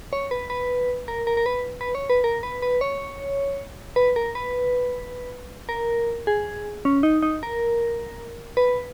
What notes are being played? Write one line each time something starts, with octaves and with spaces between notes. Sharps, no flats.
C#5
B4
B4
A#4
A#4
A#4
B4
B4
C#5
B4
A#4
B4
B4
C#5
B4
A#4
B4
A#4
G#4
C#4
D#4
D#4
A#4
B4